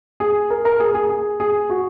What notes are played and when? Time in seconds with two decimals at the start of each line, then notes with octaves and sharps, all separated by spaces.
0.20 G#4
0.50 A#4
0.65 A#4
0.80 G#4
0.94 G#4
1.09 G#4
1.40 G#4
1.70 F#4